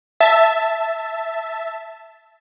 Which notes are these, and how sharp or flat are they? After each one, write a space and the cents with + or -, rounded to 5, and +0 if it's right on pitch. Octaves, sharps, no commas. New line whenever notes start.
E5 +5 A5 +0